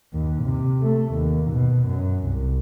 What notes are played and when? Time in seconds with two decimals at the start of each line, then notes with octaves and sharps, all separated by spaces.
0.13 D#2
0.43 C3
0.82 A3
1.13 D#2
1.51 B2
1.87 F#2
2.24 C2